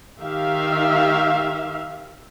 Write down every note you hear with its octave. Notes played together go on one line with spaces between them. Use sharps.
D#3 G4 E5 F5